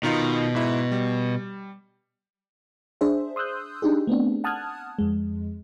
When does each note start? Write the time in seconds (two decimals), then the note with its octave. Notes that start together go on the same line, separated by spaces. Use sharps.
0.03 B2 D#3 D#4 F4
0.55 G#2 E4
0.92 G3
3.01 D4 G#4 C5 E5
3.36 C6 D#6 E6 F#6 G6
3.82 D4 D#4 G4 G#4
4.07 A3 B3 C4 D4
4.44 F#5 A5 D#6 F6 F#6 G#6
4.99 F2 G#3